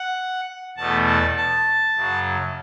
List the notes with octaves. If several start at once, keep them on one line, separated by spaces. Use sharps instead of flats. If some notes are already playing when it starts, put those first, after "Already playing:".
Already playing: F#5
E2 B2 A3 A5
A5
A5
F#2 C#3 F#3